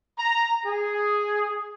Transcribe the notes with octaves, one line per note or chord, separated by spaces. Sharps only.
A#5
G#4